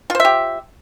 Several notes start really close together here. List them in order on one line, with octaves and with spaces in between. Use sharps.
F4 C5 E5 G4